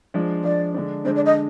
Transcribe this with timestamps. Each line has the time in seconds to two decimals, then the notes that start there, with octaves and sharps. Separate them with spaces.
0.14 F3 G#3 D4
0.44 F3 G#3 D4 D5
0.74 D3 G#3 D4
1.05 D3 G#3 D4 C5
1.16 D5
1.26 D#5